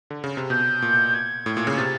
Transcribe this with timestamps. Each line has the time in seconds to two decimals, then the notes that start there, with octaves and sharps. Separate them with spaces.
0.11 D3
0.24 C#3
0.37 C3
0.50 B2 G6
0.82 A#2
1.14 G#6
1.46 A2
1.57 A#2
1.67 C#3
1.77 C3 A6